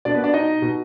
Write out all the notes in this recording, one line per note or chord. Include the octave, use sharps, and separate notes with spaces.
B2 D4 D5
B3 B4
D4 D5
D#4 D#5
B2